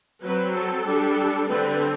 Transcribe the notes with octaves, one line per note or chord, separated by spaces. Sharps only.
F#3 C4 B4
A4
G3 D4
D3 G3 C4 B4